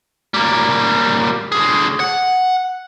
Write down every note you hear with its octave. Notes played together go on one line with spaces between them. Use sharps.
G3 A#3
D3 G#4
F#5